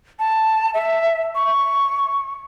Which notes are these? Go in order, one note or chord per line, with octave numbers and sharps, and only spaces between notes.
A5
E5
C#6